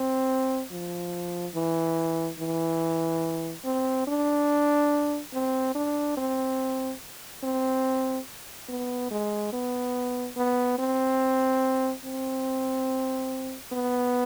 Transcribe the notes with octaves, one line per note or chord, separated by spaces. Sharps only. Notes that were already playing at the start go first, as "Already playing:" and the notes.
Already playing: C4
F3
E3
E3
C4
D4
C4
D4
C4
C4
B3
G#3
B3
B3
C4
C4
B3